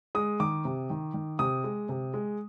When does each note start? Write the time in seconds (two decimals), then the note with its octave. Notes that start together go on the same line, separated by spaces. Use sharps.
0.15 G#3 D#6
0.40 D#3 D6
0.65 C3
0.90 D#3
1.14 D#3
1.39 C3 D#6
1.64 G#3
1.89 C3
2.14 G#3